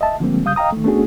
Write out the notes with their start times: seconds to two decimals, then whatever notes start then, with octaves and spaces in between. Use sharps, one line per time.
0.01 D#5 E5 A5
0.20 D3 F3 G3 G#3 A#3 C4
0.44 C#2 C#3 G3 F5 D#6 G6
0.56 D#5 F5 G5 A#5 D#6
0.72 D#3 A3
0.84 A3 B3 C#4 D4 F#4 G#4